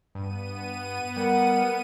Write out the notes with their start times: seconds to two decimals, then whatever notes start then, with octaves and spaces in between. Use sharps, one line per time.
0.15 G2 B3 D#7
1.16 G3 A#4 F#5